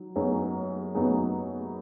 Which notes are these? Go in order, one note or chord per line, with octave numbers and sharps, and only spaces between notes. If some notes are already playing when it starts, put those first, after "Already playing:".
Already playing: F#3 D#4
F#2 F#3 B3 D#4 G#4
F#2 F#3 B3 D#4 G#4